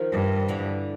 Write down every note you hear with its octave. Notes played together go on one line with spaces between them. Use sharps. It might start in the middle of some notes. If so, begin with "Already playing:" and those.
Already playing: D#3 F3
G2
D3 E3